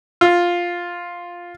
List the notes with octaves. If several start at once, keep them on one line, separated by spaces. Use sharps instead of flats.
F4